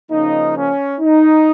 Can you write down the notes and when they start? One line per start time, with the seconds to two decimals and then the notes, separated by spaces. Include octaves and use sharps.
0.11 C#3 F3 A#3 C#4 D#4
0.55 C#4
1.00 D#4